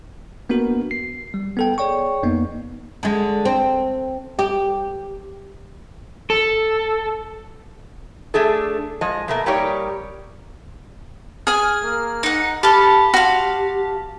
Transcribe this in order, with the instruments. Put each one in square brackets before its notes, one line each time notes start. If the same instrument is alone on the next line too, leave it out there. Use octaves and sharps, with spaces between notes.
[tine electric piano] A#3 B3 D4 F#4 A#4
C7
G3
B3 A4 G5
G#4 C#5 D5 G5 C#6
F2 A#3 B3 D#4
[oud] D3 G#3
C4
G4
[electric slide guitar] A4
[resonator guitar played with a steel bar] A3 D4 G#4 A4
F3 G#3 D#5
B2 A3 A#3
G3 A#3 D#4 G4 C#5 D5
[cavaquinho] G#4 G#5 [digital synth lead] F6
[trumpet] A#3
[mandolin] D#4 F#5
[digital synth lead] G4 [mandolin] A4 F5 A5 [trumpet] B5
[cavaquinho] F#4 [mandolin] F5 C6 [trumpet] A5